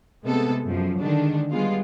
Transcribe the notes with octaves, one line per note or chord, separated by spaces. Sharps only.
C3 G#3 A3 B3 A4
F#2 F3
D3 D#3 G#3 D4
G3 G#3 B3 F4